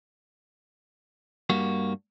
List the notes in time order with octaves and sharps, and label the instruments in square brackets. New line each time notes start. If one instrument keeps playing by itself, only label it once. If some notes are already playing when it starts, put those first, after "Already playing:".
[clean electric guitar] G2 G3 A#3 F#4